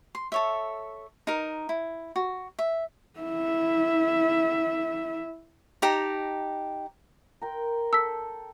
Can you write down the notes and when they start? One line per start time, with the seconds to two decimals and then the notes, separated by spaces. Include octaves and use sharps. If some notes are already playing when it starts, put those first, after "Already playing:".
0.15 C6
0.32 A4 C#5 E5
1.27 D#4 A#4
1.69 E4
2.16 F#4
2.59 E5
3.20 E4 E5
5.82 D#4 G4 A5 A#5
7.42 A#4 G5 C6
7.93 A4 E6 B6